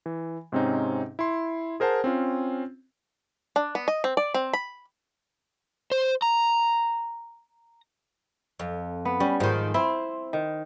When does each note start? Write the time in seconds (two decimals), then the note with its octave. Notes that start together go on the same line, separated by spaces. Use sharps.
0.06 E3
0.52 G#2 C3 C4 C#4 D#4
1.19 E4 C6
1.80 G#4 A#4 C5 F#5 A5
2.04 C4 C#4 F4
3.56 D4
3.75 B3
3.88 D#5
4.04 C4
4.17 D5
4.34 C4
4.53 B5
5.91 C5
6.22 A#5
8.59 F2
9.05 B3
9.20 G3 C#4
9.40 G#2 D#3 F3 F4 C5
9.74 C4 E4
10.33 D#3